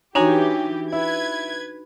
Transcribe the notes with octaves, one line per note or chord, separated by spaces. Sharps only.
E3 D4 D#4 F#4 G4 C#5 G#5 A#5
E4 B4 G#6